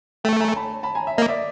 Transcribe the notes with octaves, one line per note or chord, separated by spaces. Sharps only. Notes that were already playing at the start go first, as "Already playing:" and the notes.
A3 G5 A5
G#5 A#5
A5 B5
A5 B5
G#5 A#5
E5
A#3 D#5
D5 E5